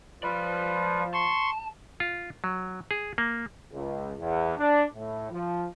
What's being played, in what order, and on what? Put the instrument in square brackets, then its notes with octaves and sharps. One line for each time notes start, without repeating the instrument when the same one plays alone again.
[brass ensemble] F3 [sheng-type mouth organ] F4 B4 [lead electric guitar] D5 B5
[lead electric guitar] A5 [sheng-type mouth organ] C6 C#6
[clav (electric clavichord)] F4
F#3
G#4
A#3
[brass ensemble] C#2
E2
D4
A2
F3